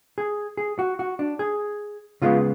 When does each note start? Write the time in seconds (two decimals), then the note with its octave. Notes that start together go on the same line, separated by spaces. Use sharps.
0.18 G#4
0.57 G#4
0.79 F#4
0.99 F#4
1.19 D4
1.39 G#4
2.22 C#3 G#3 B3 F4